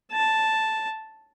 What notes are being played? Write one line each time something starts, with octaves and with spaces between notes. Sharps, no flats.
A5